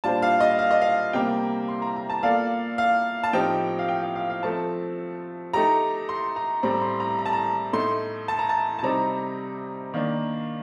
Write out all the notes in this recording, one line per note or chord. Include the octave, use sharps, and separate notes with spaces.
A#2 G3 D4 F4 C5 A5
F5
D#5
F5
D#5
F5
C3 G3 A#3 G5
C6
A#5
A#5
A5
A#3 F4 A4 D5 F5
F5
A5
A2 F3 C4 D#4 G4 G5
F5
G5
F5
F5
F5
F3 A3 C4 A5
A3 D#4 G4 A#5
C6
A#5
A2 G3 C4 A#5
C6
A#5
A#5
A5
A#5
A2 A3 D#4 C6
A5
A#5
A5
A5
C3 G3 C4 D#4 A#5
D#3 A#3 D4